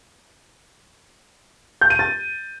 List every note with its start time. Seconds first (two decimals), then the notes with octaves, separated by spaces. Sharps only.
1.81 G6
1.90 D#7
1.99 A6